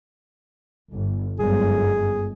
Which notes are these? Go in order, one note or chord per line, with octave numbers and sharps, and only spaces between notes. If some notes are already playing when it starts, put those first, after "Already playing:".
G1
G1 F#2 G#3 G#4